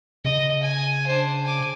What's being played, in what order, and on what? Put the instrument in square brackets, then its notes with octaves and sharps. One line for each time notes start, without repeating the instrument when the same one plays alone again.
[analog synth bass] C#3 [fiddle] D#5
[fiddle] G#5
D4 C5
G#5 D6